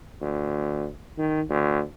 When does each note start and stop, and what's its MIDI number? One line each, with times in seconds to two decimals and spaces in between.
0.21 0.88 38
1.18 1.42 51
1.49 1.82 38